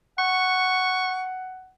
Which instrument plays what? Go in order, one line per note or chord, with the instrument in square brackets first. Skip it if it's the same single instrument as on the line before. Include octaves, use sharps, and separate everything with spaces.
[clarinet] F#5 [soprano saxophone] C#6